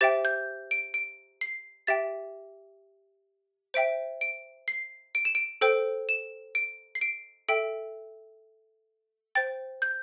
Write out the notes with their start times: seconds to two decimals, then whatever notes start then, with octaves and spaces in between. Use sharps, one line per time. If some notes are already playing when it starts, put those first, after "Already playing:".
0.01 G4 C5 E5 G5 A6
0.25 G6
0.71 D7
0.94 D7
1.41 C7
1.87 G4 E5 G5 A6
3.74 C5 E5 G5 D7
4.21 D7
4.68 C7
5.15 D7
5.25 E7
5.35 D7
5.61 A4 C5 G5 D7
6.09 E7
6.55 D7
6.95 C7
7.01 D7
7.48 A4 E5 G5 D7
9.35 C5 G5 A6
9.82 G6